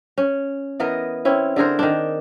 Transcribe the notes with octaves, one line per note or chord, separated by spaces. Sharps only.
C#4
E3 B3 A#4 D#5
C4 C#4 E4
D3 G#4 A#4 C5
D#3 D4